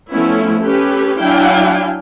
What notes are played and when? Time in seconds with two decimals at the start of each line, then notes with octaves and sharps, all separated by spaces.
0.11 F3 A3 B3 C#4 E4
0.63 C#4 G4 A4 B4
1.20 F#3 D4 E4 F5 G5 G#5